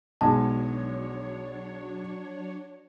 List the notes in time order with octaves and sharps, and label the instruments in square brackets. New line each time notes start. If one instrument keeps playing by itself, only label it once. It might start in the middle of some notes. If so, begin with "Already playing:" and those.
[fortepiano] B1 G#3 [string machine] F#3 D4 C#5 [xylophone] A5